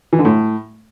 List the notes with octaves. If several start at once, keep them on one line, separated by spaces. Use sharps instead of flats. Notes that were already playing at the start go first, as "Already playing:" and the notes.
E3
D3
A2